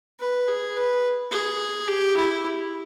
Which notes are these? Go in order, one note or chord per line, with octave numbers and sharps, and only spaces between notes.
B4
G#4
B4
G#4
G4
E4